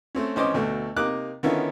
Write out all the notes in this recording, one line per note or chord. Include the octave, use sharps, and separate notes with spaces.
A3 C4 C#4
G#1 E3 C#4 C5 D#5 D6
D2 B2 A3
C3 A#3 D#4 D6 F#6
D3 D#3 B3 C#4 E4 F4